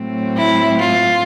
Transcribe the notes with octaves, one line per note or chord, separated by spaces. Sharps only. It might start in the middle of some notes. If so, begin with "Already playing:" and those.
Already playing: A2 F#3 A3 C4
E4
F4